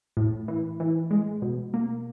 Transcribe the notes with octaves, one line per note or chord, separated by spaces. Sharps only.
A2
E3
E3
G#3
B2
A#3